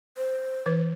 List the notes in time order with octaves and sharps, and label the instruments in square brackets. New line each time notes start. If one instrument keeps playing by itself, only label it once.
[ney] C5
[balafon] E3 B4